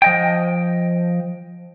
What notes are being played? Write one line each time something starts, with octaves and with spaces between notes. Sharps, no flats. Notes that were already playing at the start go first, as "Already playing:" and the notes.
F3 D#5 G5